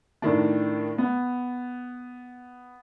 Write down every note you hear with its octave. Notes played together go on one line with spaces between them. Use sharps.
A2 D#3 D4
B3